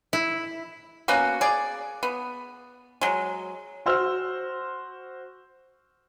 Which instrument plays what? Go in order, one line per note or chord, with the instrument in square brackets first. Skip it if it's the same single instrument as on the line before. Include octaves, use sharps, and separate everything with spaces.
[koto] E4
[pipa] A#3 B3 C#4 F#4
G#4 D5
B3
F#3 G#3
[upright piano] F#4 C5 E6 F6